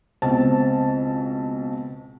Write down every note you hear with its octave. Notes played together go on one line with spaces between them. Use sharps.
C#2 B2 C4 A5